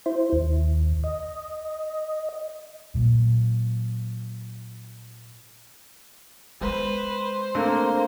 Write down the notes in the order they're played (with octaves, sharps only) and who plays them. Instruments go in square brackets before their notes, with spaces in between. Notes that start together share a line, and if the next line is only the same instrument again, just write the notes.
[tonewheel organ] E4 C5
D#2
D#5
[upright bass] A#2 F#3
[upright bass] G#3 B3 [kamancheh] B4 [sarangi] C5
[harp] A3 C4 D4 [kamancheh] A#3